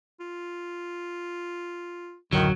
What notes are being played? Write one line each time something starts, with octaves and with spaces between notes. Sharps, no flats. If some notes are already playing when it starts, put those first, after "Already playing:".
F4
D1 F#2 D3 D#3 F#3 E4